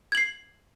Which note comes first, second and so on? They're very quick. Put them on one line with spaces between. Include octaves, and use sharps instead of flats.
G#6 F#7 C7